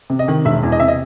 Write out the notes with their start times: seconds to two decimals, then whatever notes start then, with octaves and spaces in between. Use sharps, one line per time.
0.10 C3
0.19 D#5
0.28 D#3
0.45 E1 E5
0.63 E2
0.72 D#5
0.80 C3 E5
0.88 D#5